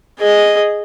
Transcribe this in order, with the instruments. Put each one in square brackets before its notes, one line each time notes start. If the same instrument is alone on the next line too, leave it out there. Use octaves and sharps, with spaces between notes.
[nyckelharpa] G#4 D#5